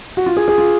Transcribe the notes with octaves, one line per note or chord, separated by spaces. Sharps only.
F#4
F4
G#4
G#4
F4